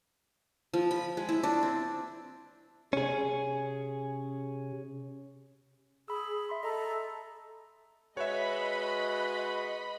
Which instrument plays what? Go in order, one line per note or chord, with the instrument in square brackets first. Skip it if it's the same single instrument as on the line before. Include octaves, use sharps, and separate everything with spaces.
[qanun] F3
B5
G#3
E4
D4
C4
[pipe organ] C3 [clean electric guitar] C#4 G#4
[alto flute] G#4 [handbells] B5 E6
[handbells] E5 B5 C6
[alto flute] A4 [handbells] D#5 A#5
[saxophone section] G#3 F#4 B4 [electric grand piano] C#5 E5 [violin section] D#5 B5